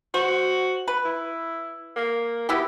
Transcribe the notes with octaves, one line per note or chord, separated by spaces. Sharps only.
F#4 C5
B4
E4
A#3
B3 E4 F#4 G4